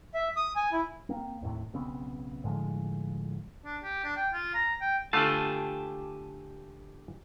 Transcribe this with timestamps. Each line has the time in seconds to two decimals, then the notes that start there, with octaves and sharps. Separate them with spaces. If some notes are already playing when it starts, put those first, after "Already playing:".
0.14 E5
0.36 D#6
0.56 G#5
0.72 E4
1.09 A#3 C4
1.42 D#2 A2 C3
1.73 B1 C#3 B3 C4
2.44 A2 D3 F3 G#3
3.65 D4
3.83 G4
4.04 D4
4.16 G5
4.33 F4
4.54 A#5
4.81 G5
5.13 D3 A3 F4 G4 G#5 A5